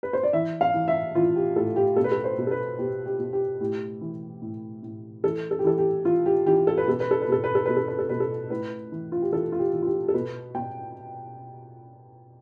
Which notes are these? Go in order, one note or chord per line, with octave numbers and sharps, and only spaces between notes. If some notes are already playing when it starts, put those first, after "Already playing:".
B4
C5
D5
E3 E5
F5
E3
E5
E3 F4
G4
A2 A4
G4
B2 A4
B4
A4
C5
B2
A4
B4
B2 G4
G4
B2
G4
A2 G4
E3
A2
A2
E3 A4
A4
G4
E3 A4
G4
E3 F4
G4
E3 G4
A4
B4
B2 A4
B4
A4
B4
B2 A4
B4
A4
B2 B4
A4
B4
A4
B2 B4
A4
A2 B4
E3
F4
G4
E3 A4
F4
G4
E3
F4
G4
A4
B2 B4
B2 G5